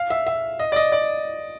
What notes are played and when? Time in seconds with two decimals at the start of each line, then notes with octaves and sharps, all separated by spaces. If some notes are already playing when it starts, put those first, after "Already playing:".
Already playing: F5
0.10 E5
0.27 E5
0.59 D#5
0.72 D5
0.76 D#5
0.92 D5